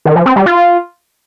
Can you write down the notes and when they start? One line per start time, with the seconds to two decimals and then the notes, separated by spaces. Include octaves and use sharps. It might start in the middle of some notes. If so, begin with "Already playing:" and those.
0.05 D#3
0.16 F3
0.26 C4
0.36 G3
0.46 F4